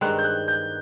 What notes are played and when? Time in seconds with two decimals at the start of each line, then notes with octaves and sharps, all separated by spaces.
0.01 G2 D#3 G#3 C4 F#6
0.18 G6
0.24 F#6
0.48 G6